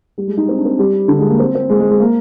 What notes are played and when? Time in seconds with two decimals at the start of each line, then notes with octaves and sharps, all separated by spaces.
0.18 G3
0.28 G#3
0.37 D#4
0.49 C4
0.57 D4
0.65 C4
0.79 G3
1.08 D3
1.19 G#3
1.28 A#3
1.39 C4
1.55 C4
1.70 G#3
1.80 G#3
1.90 G#3
2.00 A#3